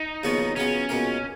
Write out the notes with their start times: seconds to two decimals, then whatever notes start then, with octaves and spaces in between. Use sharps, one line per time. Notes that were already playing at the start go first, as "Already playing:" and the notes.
Already playing: D#4
0.23 D#2 C#3 F3 B3 F#4
0.56 C#3 F#3 B3 C#4 F4
0.89 C#2 B2 A#3 F4